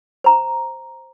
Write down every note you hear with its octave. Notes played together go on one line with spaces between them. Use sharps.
C5 A#5